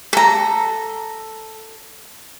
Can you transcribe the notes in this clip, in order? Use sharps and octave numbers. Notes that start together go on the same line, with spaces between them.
A4 A#5